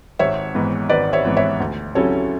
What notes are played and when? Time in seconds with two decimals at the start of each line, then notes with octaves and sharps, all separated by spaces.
0.19 G#1 C#5 E5
0.54 G#2 E3 B3
0.90 G#1 B4 D5
1.13 C#5 E5
1.25 G#2 E3 B3
1.37 C#5 E5
1.60 D2
1.95 C#3 F#3 C#4 E4 A4 C#5